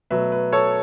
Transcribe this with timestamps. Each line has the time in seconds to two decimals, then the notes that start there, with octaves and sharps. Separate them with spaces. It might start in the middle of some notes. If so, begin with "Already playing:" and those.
0.10 B2 F#3 A3 B4 E5
0.32 B4
0.53 A4 C#5